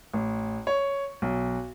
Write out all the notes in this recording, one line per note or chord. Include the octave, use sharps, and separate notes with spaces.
A1
C#5
B1